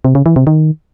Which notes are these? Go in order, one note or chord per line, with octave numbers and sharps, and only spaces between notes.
C3
C#3
E3
C3
D#3